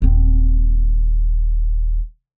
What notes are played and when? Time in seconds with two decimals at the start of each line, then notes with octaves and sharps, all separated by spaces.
0.02 D#1 C4